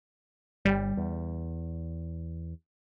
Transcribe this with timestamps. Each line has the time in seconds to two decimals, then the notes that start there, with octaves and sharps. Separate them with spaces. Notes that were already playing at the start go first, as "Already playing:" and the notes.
0.65 G1 G3
0.97 E2